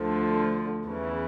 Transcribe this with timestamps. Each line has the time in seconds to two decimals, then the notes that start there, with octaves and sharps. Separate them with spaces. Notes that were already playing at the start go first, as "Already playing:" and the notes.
Already playing: D2 D3 F3
0.85 E2 C#3 E3